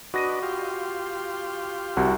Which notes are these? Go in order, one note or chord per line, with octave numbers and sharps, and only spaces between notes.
D4 F#4 B4 D#5 A#6 D#7
F4 G4 C6
C2 C3 F#4